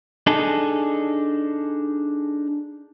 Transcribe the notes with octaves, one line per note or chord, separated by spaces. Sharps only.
D4 D#4 G#4 A4